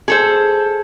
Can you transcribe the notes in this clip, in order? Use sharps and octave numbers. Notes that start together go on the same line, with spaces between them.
G#4 A4 C5